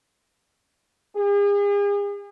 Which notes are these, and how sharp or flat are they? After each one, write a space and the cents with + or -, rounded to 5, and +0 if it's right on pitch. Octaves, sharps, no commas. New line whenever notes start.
G#4 -40